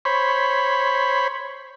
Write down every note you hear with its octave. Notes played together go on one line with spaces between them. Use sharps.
C5 C#5 B5